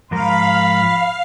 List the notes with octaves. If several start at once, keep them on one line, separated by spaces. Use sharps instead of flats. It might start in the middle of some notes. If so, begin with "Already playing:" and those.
G#2 F3 A#4 F5 B5